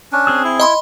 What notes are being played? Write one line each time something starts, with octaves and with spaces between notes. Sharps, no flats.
C#4 D4
C4 G#4 E6
E4
D#5 B5 C6